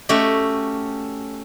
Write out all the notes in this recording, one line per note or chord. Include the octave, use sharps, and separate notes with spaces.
A3 C#4 F#4 G4